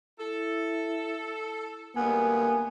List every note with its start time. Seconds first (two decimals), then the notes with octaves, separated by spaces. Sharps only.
0.20 E4 A4
1.96 D2 G3 A#3 B3 G#5